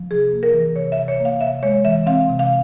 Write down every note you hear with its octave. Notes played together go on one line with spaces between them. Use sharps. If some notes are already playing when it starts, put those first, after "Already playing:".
Already playing: F3
C3 G#4
A#3
A#4
E3
C3 C#5
E5
C3
C#5
A#3
F5
C3 E5
G#3 C#5
E3 E5
C4 F5
C3
F5